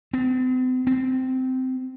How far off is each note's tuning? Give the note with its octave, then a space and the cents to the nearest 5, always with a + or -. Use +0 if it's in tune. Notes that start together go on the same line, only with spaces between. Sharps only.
C4 -45
C4 -15